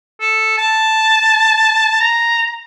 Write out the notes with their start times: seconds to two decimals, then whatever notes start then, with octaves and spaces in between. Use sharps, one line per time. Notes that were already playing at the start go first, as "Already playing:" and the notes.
0.21 A4
0.57 A5
2.01 A#5